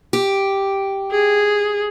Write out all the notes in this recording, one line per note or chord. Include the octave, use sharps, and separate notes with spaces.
G4
G#4